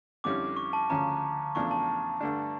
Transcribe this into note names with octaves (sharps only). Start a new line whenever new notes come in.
F2 D3 G3 C#4 E4 D6
C#6
A5
D2 C#3 F3 C#4 A#5
E2 C#3 F3 A3 D4 C#6
A5
G2 D3 A3 D4